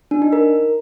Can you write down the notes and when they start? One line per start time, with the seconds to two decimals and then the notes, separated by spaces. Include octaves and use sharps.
0.11 D4
0.22 D#4
0.33 A#4